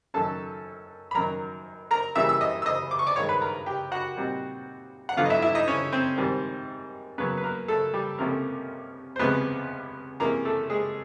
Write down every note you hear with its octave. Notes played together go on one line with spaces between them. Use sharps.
F#2 D#3 F#3 A3 C#4 A4 A5
B5
F#2 D#3 F#3 A#4 A#5
A#4 A#5
C#3 E3 G3 A#3 E5 E6
E6
D#5 D#6
E6
D#5 D#6
D6
C#6
D5 D6
G2 D#3 G#3 C#5 C#6
B4 B5
A#4 A#5
G4 G5
F#4 F#5
A#2 G3 C4 D#4
F#5
G2 D3 F#3 B3 F4 F5
D#5
E4 E5
E4 E5
D#4 D#5
C#4 C#5
C4 C5
G#2 D#3 G3 C4
C#3 F#3 A#3 B3 B4
B4
A#3 A#4
A3 A4
G3 G4
C#2 C3 F3 A3 A#3 C#4 A#4
C5
C#2 C3 F3 G#3 B3 C#4 B4
C3 E3 G#3 A#3 C#4 A#4
A3 A4
G#3 G#4